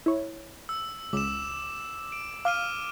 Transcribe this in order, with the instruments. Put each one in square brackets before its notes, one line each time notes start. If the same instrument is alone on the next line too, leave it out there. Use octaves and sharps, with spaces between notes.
[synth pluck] E4 C#5
[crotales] E6
[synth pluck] C#2 [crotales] D6 E7
[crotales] D7
[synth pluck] F5 [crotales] D6 F6 D#7